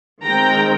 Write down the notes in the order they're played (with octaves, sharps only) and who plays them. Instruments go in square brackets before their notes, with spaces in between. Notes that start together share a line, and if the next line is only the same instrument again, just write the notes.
[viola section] D#3 G#3 C4 G5 A#5